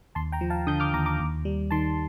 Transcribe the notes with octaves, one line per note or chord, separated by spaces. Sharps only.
D#2 A5 C6
G5 A#5
F3
F5 A5
D3 D#6 G6
D6 F6
D#2 A#5 D6
A#5 D6
D#2
G3
D#3 A5 C6